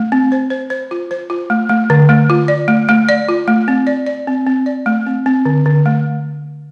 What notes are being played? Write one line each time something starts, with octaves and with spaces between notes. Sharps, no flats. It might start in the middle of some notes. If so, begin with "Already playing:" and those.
Already playing: A3
C4
C5
C5
C5
F4
C5
F4
A3
A3
D3
A3
F4
D5
A3
A3
D5
F4
A3
C4
D5
D5
C4
C4
D5
A3
C4
C4
D3
D3
A3